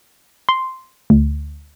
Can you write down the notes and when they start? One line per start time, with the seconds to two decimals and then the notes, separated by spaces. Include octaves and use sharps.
0.49 C6
1.10 D2